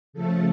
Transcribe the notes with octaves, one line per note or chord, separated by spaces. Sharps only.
C#3 F3 A3 A4